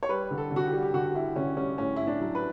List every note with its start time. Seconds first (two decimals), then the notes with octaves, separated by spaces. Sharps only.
0.03 C#5
0.09 G3 B4
0.31 D3
0.38 A4
0.51 D3
0.56 F#4
0.66 G4
0.72 G3
0.83 G4
0.93 D3 F#4
1.15 G3 E4
1.35 D3 C#4
1.57 G3 C#4
1.78 A2 C#4
1.96 A2 E4
2.07 D4
2.21 F#3
2.35 B4